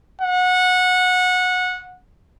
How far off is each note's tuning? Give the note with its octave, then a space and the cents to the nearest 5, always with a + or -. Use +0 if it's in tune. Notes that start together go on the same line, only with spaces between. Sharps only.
F#5 -20